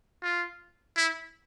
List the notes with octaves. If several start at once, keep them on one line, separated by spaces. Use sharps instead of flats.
F4
E4